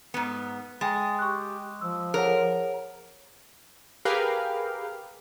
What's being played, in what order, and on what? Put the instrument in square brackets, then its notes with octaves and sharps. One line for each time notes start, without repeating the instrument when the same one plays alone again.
[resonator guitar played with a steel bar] G#2 B3
[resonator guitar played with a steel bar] G#3 [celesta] G5 G#5 A6
[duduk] G4 [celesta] C#6 F#6
[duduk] F3 [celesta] E6
[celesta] G#4 C#5 F#5 [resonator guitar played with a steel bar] A#4
[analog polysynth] G4 G#4 A#4 B4 F5 G5